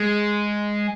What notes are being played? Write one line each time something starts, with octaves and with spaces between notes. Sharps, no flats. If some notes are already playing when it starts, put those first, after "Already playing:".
Already playing: G#3